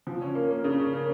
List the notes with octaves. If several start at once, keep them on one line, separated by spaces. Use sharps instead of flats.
F3
C#4
A#3
A#3
C#3
C#4
A#3